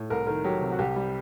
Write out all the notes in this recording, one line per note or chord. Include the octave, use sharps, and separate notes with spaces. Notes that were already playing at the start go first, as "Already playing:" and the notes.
Already playing: A2
C2 A#4
D#3 A#4
F#3 G4
C3
F#4
C2 G4
G3